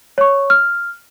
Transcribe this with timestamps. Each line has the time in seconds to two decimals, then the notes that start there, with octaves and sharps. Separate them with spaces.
0.18 C#5 C#6
0.50 F6